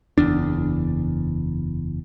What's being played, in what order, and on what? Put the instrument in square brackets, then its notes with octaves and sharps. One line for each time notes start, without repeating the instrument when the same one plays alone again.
[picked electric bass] F#1 E2 D4